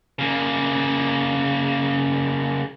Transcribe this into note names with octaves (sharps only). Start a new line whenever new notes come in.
C#3 A#3